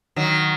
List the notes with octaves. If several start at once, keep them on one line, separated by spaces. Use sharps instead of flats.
D#3 F#3